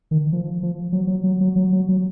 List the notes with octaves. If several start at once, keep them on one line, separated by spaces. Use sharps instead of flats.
D#3
F3
F3
F#3
F#3
F#3
F#3
F#3
F#3
F#3